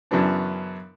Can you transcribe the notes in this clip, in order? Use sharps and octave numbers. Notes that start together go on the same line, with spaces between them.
F#2 C#3 E3 F#3 B3 D4